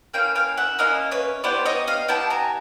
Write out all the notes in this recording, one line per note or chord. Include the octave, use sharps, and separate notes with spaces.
A#3 C#4 E4 F5 G5
F5 G5
E5 F#5
A#3 C#4 E4 D#5 F5
B4 C#5
B3 E4 G4 C5 D5
C#5 D#5
D#5 F5
B3 E4 G4 G5 A5
G#5 A#5